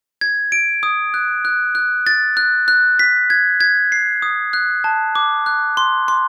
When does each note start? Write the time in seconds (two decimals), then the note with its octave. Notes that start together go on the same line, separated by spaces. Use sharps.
0.21 G#6
0.52 D7
0.83 D#6
1.14 F#6
1.45 F#6
1.75 F#6
2.07 A6
2.37 F#6
2.68 F#6
2.99 B6
3.30 G#6
3.61 G#6
3.92 C7
4.22 D#6
4.53 F#6
4.84 A5
5.15 D6
5.46 F#6
5.77 C6
6.08 C6